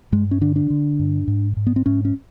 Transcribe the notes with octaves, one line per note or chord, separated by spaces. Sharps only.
G2 G#3
C#4
D3 D4
D4
D3
G2
G#2
G#2
B3
C4
G#2 C#4
C#4